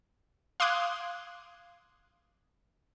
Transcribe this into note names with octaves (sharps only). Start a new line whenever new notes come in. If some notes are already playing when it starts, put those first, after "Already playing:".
F5 C6 D6 D#6 F#6 G#6